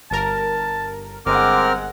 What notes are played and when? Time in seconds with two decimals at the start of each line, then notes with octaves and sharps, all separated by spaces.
0.11 G1 A#4 A5
1.26 G1 G#3 C4 A#4 F#5 D6 F6